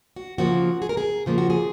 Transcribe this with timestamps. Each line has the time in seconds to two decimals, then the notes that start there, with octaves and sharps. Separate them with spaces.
0.16 F#4
0.38 C#3 F3 A#3 F#4
0.82 G#4
0.89 A#4
0.97 G#4
1.26 C#3 F3 A#3 G#4
1.38 F#4
1.50 G#4